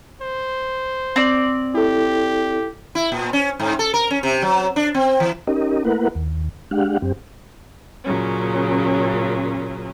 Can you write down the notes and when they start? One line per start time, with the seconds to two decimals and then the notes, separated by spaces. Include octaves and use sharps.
0.21 C5
1.16 C4 D5
1.74 E4 G4 A4
2.95 E4
3.12 A#2
3.33 C#4
3.60 G#2
3.79 A4
3.94 A#4
4.11 C#4
4.23 C3
4.42 F#3
4.76 D4
4.94 C4
5.20 E3
5.47 C#4 D#4 G4 A#4 D#5
5.85 A3 A#3 E4 A#4 B4 F#5
6.15 D#2
6.71 G#3 D4 G4 F5 F#5
7.02 F#2 C4 G4
8.05 A#2 C#3 F#3 C#4